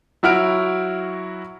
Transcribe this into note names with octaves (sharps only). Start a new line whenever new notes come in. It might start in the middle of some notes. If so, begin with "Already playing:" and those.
F#3 E4 F#4 F6 D7